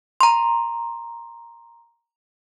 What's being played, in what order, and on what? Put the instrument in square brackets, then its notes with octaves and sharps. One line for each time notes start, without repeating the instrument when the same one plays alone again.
[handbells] A#5 C6